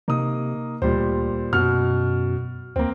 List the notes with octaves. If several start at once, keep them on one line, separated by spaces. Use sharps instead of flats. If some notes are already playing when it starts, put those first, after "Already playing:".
C3 A#3 D#4 D#6
D2 A#2 G3 C5
F#2 B2 F6
D2 A#3 C4